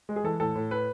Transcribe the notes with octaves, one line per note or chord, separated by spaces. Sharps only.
G#3
G#4
E3 A4
A2 A4
A2
B4